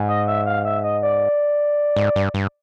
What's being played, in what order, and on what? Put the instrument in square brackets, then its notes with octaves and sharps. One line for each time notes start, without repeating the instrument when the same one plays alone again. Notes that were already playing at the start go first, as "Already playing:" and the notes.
Already playing: [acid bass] G#2
[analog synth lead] D#5
E5
F5
E5
D#5
D5
[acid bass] G#2
G2
G2